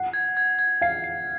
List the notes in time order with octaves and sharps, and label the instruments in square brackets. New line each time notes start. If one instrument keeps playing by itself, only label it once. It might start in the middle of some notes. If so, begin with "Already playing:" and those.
Already playing: [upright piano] F#5 [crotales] C7
[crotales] G#6
G#6
G#6
[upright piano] F5 [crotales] C7
[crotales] C7